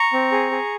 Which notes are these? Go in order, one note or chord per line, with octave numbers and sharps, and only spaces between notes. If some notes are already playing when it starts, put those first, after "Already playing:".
Already playing: A#5 C#6
C4
G#4
G#4